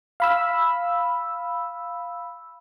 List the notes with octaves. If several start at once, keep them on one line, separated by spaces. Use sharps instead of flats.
F5 B5 E6